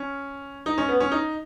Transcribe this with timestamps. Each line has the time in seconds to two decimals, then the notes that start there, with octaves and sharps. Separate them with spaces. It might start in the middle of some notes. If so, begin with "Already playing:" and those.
Already playing: C#4
0.66 D#4
0.78 C#4
0.88 B3
1.00 C#4
1.12 D#4